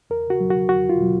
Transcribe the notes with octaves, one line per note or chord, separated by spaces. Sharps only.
E2 A#4
F#4
B2 F#3
F#4
E2 F#4
F4
B2 F#3